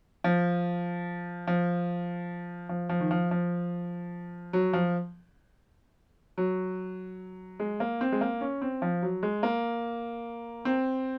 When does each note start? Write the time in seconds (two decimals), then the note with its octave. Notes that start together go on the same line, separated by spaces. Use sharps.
0.24 F3
1.47 F3
2.69 F3
2.89 F3
3.00 D#3
3.11 F3
3.31 F3
4.53 F#3
4.73 F3
6.38 F#3
7.60 G#3
7.80 A#3
8.01 C4
8.12 G#3
8.21 A#3
8.41 C#4
8.62 C4
8.82 F3
9.02 F#3
9.23 G#3
9.43 A#3
10.65 C4